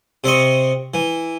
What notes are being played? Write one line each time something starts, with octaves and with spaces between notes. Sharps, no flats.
C3 C4 D#5 C#6
E3